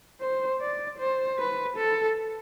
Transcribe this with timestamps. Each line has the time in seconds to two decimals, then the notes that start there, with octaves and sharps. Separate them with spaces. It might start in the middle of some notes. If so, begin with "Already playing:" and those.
0.20 C5
0.61 D5
0.99 C5
1.39 B4
1.77 A4